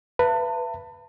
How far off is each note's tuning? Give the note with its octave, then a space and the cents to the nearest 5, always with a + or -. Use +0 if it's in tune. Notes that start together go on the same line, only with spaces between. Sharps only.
B4 +0 E5 +35 A5 +40